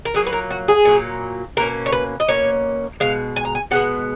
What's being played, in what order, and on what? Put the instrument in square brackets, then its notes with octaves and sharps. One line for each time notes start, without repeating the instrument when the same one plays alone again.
[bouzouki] A#4
A#2 F#3 A#3 G#4
B4
A#4
F#4
G#4
A#2 F#3 A#3
B2 A#3 C#4 A#4
C#5
B4
D#5
B2 A#3 C#4 C#5
B2 G#3 F5
G#5
A#5
G#5
B2 G#3 B3 F#5